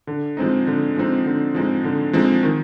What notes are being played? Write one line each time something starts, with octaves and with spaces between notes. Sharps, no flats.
D3
F3 G#3 C4 D#4
D3
F3 G#3 C4 D#4
D3
F3 G#3 C4 D#4
D3
F3 G#3 C4 D#4
D#3